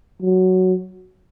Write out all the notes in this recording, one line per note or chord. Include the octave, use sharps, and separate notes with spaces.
F#3